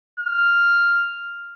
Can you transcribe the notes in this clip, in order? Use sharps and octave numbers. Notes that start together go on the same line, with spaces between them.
F6